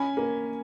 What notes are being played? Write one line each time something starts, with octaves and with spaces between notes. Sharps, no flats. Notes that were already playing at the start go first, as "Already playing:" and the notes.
Already playing: C#4 G#5 B5
A#3